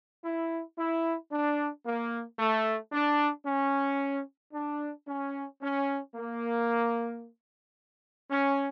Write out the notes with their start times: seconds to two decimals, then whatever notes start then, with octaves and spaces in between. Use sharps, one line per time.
0.24 E4
0.78 E4
1.31 D4
1.85 A#3
2.39 A3
2.93 D4
3.46 C#4
4.53 D4
5.07 C#4
5.61 C#4
6.15 A#3
8.30 C#4